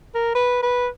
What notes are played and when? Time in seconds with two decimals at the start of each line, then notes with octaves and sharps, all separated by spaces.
0.15 A#4
0.35 B4
0.63 B4